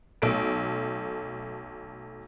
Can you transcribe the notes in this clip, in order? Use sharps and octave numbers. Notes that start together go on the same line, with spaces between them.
B1 A3 D7